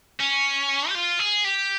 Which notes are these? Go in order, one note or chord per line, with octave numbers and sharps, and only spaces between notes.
C#4
G4
F4
G#4
G4